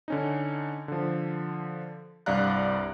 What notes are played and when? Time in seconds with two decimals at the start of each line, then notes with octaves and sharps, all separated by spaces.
0.08 D3 C#4 D#4
0.88 D3 F3
2.26 C2 G2 D5 F5 A#5 F#6